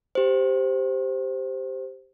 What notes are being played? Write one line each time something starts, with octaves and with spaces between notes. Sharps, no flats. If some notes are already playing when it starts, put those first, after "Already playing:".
G4 C5